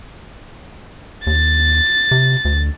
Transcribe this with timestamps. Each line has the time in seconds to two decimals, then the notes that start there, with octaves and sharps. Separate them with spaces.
1.27 D#2 A6
2.11 C3
2.45 D2